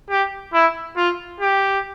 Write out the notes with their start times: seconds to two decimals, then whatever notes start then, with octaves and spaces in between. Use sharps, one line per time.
0.10 G4
0.53 E4
0.96 F4
1.40 G4